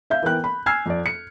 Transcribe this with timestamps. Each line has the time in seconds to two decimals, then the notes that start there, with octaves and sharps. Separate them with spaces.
0.10 E5 F5 G6
0.22 E3 B3 A#4 G5 F#6
0.44 B5
0.66 G#5 E6 F6 G#6 C7
0.86 F2 D5
1.06 C#7